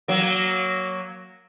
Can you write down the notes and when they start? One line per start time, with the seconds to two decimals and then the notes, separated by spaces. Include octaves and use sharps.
0.08 F#3 A#3